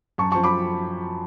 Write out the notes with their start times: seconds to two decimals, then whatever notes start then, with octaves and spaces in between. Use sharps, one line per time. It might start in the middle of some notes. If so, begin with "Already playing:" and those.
0.18 F#2 A5 C#6
0.32 F3 A5 C#6
0.43 B5 D6